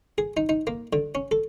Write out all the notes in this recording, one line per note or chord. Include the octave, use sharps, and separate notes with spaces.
G#4
D#4
D#4
A#3
D3
C#4
A4